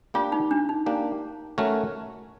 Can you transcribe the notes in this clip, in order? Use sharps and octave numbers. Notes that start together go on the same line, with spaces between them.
A#3 D4 F4 G4
D#4
D4
D#4
A#3 D4 G4
A3 C#4 F#4 A#4 C#5